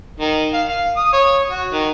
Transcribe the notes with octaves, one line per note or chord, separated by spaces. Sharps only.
D#3
F5
F5
D#6
C#5
F#4
D#3